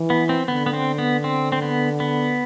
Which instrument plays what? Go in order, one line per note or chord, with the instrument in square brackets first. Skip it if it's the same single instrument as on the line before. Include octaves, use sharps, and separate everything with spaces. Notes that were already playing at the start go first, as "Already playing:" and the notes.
Already playing: [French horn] E3
[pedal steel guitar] B3
C4
[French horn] D3 [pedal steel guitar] B3
[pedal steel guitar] B3
C4
B3
C4
C4
B3
B3